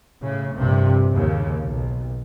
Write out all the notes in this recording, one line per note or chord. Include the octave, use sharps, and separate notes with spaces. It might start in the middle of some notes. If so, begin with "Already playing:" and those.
A2 C#3
A#1 G2 C3
D#2 C#3
B1